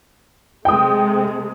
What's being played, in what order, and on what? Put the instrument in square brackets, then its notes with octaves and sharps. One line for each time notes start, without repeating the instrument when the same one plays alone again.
[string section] C3 G#3 A3 [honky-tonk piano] G5 D#6